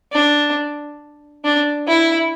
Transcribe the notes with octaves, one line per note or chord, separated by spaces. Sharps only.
D4
D4
E4